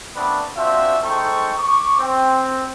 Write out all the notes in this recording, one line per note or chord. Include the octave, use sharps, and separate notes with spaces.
A3 B3 C4 D4 B4 D5
C4 D4 F4 F#4 C5 E5
G#3 D#4 A4 C5 G5 C#6
C#6 D6
C4